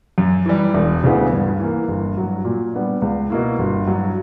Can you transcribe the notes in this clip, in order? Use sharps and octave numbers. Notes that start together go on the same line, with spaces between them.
F#2
E3 G3
E1
D2 C#3 E3 B3
G2
E3 A#3
G1
G2 F#3
A#2
G3 B3 D4
C#2
B2 A#3 E4
G1
G2 F#3